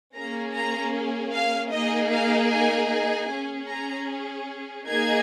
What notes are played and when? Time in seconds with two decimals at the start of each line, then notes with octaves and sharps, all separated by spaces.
0.15 A#3 C#4 G#4 A#5
0.54 A#5
1.33 F5
1.72 A#3 D#4 G#4 D#5
2.11 F5
2.51 G#5
2.90 G#5
3.29 C#4 G#4
3.68 A#5
4.86 A#3 D#4 G#4 G#6